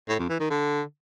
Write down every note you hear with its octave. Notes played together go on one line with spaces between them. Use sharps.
A2
F2
E3
D#3
D3